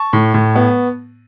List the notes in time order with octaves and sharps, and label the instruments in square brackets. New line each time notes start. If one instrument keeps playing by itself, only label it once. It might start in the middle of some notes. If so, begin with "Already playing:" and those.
Already playing: [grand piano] A5 C#6
A2
A2
B3